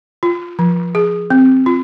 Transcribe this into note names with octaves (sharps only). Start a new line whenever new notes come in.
F4
F3
G#4
C4
F4